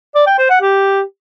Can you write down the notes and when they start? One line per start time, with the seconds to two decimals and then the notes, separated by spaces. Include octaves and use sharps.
0.15 D5
0.27 G5
0.38 C5
0.50 F#5
0.61 G4